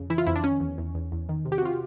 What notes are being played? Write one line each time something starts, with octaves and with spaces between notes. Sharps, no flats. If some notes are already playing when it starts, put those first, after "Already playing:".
Already playing: F2 C#3
E3 E4
F4
F2 E4
D4
D#3 C#4
E2
E2
E2
E2
D#3
C3
G4
F#4
C3 F4